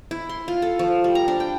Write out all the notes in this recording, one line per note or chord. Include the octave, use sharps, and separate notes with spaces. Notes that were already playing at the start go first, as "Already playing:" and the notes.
E4
C6
F4
A4
F3
G3
A#5
D4
G5